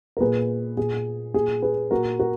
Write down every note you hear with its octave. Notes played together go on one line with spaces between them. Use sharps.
A#4
A#2 G#4 B4
A#2 G#4
A#2 G#4
G#4 B4
A#2 F#4 A#4
F#4 A#4